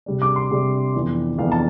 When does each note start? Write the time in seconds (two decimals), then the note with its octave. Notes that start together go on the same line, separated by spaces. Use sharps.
0.06 C3 G3 D4
0.22 D6
0.36 C6
0.51 C3 G3 D4
0.94 F2 E3 B3 D4
1.38 F2 E3 B3 D4 F5
1.52 A5